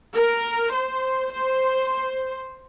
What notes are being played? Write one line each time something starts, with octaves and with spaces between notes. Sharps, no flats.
A#4
C5
C5